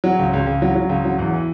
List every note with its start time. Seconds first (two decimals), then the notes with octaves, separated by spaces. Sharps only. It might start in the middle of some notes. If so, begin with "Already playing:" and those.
0.04 F#3
0.19 C#2
0.33 C#2
0.47 C#2
0.62 F#3
0.75 F#3
0.89 C#2
1.05 F#3
1.19 E2
1.33 E3